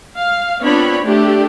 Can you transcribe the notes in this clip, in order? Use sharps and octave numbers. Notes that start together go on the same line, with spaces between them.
F5
B3 C4 D4 F4 C#5 B5
A3 D4 G4